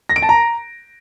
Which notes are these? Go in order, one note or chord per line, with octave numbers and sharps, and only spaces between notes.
A#6
D7
A5
A#5